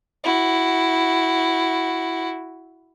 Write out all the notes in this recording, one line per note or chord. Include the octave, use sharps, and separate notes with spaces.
E4 F#4